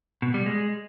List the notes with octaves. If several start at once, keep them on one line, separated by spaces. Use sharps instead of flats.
B2
G3
G#3